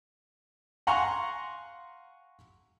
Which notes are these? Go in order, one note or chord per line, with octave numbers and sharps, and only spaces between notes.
F5 F#5 G#5 A#5 C6 C#6